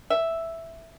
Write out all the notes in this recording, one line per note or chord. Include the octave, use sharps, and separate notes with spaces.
E5